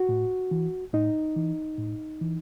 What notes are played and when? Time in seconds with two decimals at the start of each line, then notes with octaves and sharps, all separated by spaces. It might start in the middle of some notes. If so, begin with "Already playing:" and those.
Already playing: F#4
0.09 A2
0.51 E3
0.93 A2 D#4
1.36 E3
1.78 A2
2.21 E3